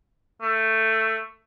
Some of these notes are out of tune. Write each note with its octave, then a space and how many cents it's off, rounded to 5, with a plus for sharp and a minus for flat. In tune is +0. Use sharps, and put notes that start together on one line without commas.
A3 +10